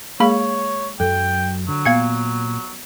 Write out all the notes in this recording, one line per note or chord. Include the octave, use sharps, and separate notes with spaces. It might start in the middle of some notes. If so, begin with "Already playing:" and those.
G#3 A#3 G#4 C#5 F5 B5
F#2 F#3 A4 G5
D3 F#3
A#2 B3 F5 G#6 C#7